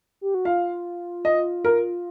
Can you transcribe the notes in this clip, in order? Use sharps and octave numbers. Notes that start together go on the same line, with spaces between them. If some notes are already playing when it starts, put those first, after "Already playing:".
G4
F#4
F4 F5
D#5
A#4